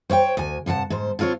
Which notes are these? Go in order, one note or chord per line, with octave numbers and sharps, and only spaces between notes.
C5 C#5 E5 G5
D2 G#5
G2 C3 F#5 A5
G#2 C5
D3 C4 F4 C5 C#5